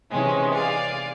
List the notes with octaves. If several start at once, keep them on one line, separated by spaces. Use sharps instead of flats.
C3 E3 G#3 C#4 D#4
G#4 D5 F5